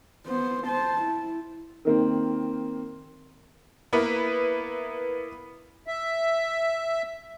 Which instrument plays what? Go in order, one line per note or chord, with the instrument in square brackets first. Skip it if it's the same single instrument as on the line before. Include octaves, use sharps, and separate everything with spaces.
[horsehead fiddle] B3 C5
C5 A5
E4
[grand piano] D#3 A#3 C4
[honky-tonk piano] A#3 B3 E4 B4
[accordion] E5